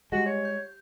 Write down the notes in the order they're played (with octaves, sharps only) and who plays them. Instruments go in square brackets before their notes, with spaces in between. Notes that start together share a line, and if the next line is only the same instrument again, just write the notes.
[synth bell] G3 G4 [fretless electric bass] G#3 [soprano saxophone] F#4
[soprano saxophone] C#5
[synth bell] G6